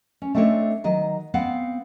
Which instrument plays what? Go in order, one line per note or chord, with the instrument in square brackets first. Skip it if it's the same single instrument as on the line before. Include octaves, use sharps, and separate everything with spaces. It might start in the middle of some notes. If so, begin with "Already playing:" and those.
[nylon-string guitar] C#4
A3 C4 D4 A4 C#5 D#5
D#3 F#3 D#5
B3 C4 F5 F#5